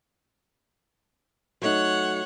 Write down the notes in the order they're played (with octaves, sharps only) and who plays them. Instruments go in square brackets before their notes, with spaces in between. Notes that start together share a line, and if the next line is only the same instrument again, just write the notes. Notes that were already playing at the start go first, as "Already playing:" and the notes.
[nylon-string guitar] F#3 A3 D#4 [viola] C#5 F#5